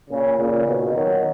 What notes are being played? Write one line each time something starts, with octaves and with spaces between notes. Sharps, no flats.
A#2 C#3
A#2 C#3
B2 D#3
D#3 F#3